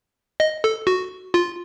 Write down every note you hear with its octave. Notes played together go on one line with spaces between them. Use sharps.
D#5
A4
F#4
F4